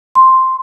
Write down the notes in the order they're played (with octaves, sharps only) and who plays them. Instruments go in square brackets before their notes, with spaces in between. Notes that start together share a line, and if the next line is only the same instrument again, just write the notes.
[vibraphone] C6